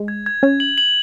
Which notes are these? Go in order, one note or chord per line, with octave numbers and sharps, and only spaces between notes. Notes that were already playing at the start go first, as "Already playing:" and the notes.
Already playing: G#3
G#6
G#6
C#4 G#6
F#7
F#7